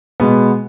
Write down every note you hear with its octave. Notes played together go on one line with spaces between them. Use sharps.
B2 G#3 B3